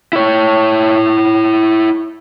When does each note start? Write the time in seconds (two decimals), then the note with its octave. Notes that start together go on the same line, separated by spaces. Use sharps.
0.13 E4 C#5